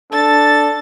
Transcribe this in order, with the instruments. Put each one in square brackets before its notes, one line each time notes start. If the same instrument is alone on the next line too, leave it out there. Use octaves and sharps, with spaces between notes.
[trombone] D4 [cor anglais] A4 [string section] A6